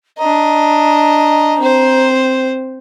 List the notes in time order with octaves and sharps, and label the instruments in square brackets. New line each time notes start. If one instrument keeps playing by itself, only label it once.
[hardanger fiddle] D4 D#5 [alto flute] A#5
[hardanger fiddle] C4 C5